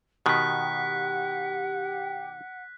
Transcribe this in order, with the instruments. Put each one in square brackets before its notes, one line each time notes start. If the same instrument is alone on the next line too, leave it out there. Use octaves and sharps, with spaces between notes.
[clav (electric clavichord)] B2 D#3 [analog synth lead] G4 [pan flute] F#5 [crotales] F#6 B6